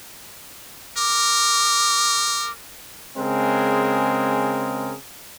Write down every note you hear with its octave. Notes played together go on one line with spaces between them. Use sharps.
A#4 D6
C#3 G#3 C4 G#4 A#4